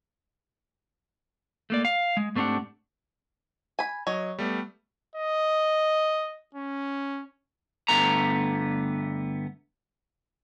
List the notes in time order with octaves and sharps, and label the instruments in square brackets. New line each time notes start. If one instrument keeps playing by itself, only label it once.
[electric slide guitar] A3 A#3 D5
F5
G#3
G#2 A3 C4 D4 G4 F#5
[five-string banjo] G#5 B5
[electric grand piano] F#3 D#5 [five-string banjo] C#5
[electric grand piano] G3 A3 B3
[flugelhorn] D#5
C#4
[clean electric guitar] G2 D3 A3 B3 A#5